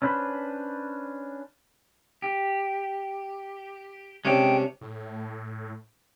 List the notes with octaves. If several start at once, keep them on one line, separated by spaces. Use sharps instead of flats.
C#4 D4 B4 C5 B5
G4
C3 G#3 C#4 D4 G5
A2